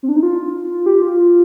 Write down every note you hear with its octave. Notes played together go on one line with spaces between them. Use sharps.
C4
D4
D#4
F4
G4
F4